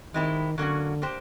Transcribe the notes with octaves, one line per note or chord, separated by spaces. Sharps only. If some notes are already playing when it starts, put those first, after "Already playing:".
B2 D#3 G#3 C4 E4 G4
D3 F#3 A#3 C#4 F#4
A#3 D4 G4 C5